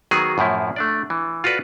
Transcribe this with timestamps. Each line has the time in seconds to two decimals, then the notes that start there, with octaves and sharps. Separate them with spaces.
0.11 D#3 F#3 B3 F#4 G#4
0.38 F#2 A2 F3 E4
0.76 A3 D4 D5
1.10 E3
1.44 F4 F#4 A4 B4 D5